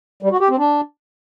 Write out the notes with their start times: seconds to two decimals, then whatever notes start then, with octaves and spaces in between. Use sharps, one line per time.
0.22 G3
0.31 F#4
0.40 G4
0.49 C4
0.58 D4